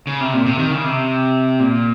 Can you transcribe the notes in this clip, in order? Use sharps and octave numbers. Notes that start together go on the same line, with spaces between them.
C#3
C3
A#2
C3
D#3
C#3
C3
A#2